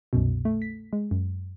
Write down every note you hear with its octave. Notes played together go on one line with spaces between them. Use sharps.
C2 F#2 B2
A3
B6
G#3
F#2